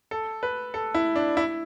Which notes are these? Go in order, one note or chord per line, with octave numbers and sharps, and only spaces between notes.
A4
B4
A4
E4
D4
E4